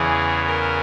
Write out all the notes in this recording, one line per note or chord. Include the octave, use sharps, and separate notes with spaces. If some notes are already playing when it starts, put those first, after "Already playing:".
Already playing: E2 C#3 E3 G#4
A#4